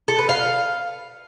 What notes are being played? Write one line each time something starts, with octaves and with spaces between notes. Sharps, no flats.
A4
B4
F5